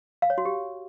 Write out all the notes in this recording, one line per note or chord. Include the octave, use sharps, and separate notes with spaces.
F5
C#5
F#4
G4